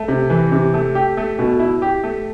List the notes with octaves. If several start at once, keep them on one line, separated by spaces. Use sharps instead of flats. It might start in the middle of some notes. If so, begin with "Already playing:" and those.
Already playing: A3
C3
E3
C3
A3
G4
A3
B2
E4
G4
A3